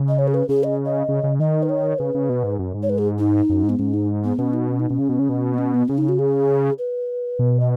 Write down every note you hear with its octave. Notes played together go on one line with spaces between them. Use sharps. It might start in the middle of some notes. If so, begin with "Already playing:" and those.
Already playing: C#3
D#5
C#5
G#4
B4
C#3 G#4
D#5
D#5
C#3
C#3
D#3 D#5
B4
C#5
C#3 B4
C#3
B2
G#2
F#2
G#2
C#5
B4
G#4
D#4
F#2
G#2
B3
G#2 C#4
D#4
B3
B2 C#4
D#4
C#4
D#4
B2 C#4
C#3
B2
C#3
B2
B3
C#4
B3
C#3 C#4
D#4
F#4
G#4
B4
B2
D#5